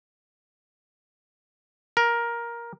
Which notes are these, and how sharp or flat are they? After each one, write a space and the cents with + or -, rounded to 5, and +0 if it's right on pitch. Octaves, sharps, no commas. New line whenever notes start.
A#4 +10